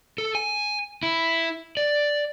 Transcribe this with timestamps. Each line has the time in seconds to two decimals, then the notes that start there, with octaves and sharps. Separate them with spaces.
0.18 A4
0.35 G#5
1.03 E4
1.77 D5